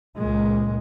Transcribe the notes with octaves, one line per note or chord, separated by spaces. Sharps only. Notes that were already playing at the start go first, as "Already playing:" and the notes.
C#2 A#2 G#3